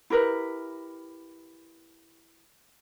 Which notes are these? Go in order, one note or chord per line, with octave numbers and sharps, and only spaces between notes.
E4 G4 A#4 B4